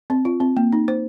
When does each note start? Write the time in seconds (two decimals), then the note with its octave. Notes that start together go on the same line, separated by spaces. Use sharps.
0.10 C4
0.25 F4
0.40 C4
0.57 A#3
0.73 D#4
0.88 C5